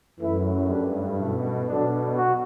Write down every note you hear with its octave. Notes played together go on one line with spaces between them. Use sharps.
F#2 E3 A3 E4
G2 F#3 A3 D4 G4 B4
F#2 B2 E3 A3
B2 D3 F#3 B3 D4
F#4